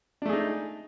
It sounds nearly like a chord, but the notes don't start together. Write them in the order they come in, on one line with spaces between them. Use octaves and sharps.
D4 A3 G#4 D#4